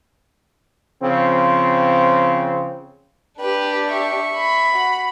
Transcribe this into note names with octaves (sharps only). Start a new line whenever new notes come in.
C#3 F3 C4
D4 G4 B4
E5 C#6
B5
F#4